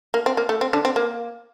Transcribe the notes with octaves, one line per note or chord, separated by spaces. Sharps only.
A#3
C4
A#3
A3
C4
D3 D4
C4
A#3